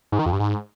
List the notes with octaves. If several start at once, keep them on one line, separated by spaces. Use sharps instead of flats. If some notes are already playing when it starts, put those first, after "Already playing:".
G#2
D#3
F2
G2
G#2